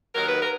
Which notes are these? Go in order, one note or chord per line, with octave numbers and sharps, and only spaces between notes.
D#2 D#3 F#3 A#4
B4
A#4